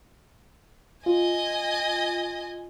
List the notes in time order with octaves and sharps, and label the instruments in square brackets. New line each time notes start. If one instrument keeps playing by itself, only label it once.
[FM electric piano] F4 [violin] D#5 G#5